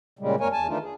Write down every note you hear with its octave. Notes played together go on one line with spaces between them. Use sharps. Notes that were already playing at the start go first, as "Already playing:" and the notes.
A#2 C#3 G3 G#3
F#2 A#3 A#4 C#5 G#5
E2 G#5 A5
D#3 E3 A3 D4 D#4 F4
G#4